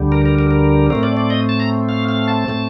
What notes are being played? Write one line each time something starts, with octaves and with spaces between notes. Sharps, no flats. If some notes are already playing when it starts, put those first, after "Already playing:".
Already playing: D2 D3 G3
A#4
A#4
A#4
A#4
A2 A3 C4 A#4
D5
D5
D#5
A5
A#5
F5
F5
A5
A2 A3 C4